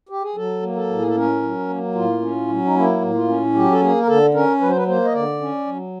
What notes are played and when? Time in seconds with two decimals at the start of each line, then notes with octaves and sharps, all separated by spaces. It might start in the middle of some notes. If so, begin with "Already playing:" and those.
0.09 G4
0.23 G#4
0.36 F#3 A4
0.63 A#3
0.76 A4
0.89 A2
0.99 G#4
1.07 A4
1.15 C#4 A#4
1.42 F#3
1.69 A#3
1.95 A2 F4
2.21 C#4
2.48 F#3
2.65 D#4
2.75 A#3 E4
3.01 A2
3.15 F4
3.28 C#4
3.55 F#3 G4
3.72 A4
3.81 A#3 G#4
4.00 A#4
4.07 D3 A4
4.34 C#4 A#4
4.61 F#3 B4
4.69 C5
4.77 B4
4.87 A#3 C5
5.05 D#5
5.14 D3 D5
5.41 C#4
5.66 F#3